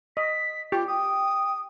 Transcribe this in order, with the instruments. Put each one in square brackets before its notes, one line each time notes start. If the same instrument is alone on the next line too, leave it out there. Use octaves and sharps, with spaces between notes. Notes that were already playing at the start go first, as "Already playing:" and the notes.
[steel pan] D#5 [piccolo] B6
[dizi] F4 [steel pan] G4
[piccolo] G5 [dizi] D#6